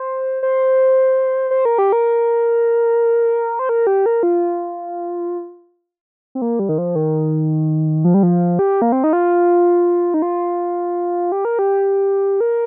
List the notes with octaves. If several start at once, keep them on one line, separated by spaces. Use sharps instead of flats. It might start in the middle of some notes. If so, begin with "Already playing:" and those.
Already playing: C5
C5
C5
A#4
G4
A#4
C5
A#4
G4
A#4
F4
C4
A#3
G3
D#3
F3
D#3
F3
G3
F3
G4
A#3
C4
D#4
F4
D#4
F4
G4
A#4
G4
A#4